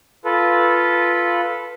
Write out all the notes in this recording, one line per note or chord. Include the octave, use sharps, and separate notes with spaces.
F4 A4 B4